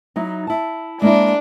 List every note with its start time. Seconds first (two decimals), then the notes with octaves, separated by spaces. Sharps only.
0.16 F#3 D#4 E4
0.47 E4 A5
1.02 G#3 A#3 D4 E4